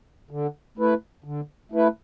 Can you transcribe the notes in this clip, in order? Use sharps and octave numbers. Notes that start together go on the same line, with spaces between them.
D3
A3 E4 B4
D3
A3 E4 B4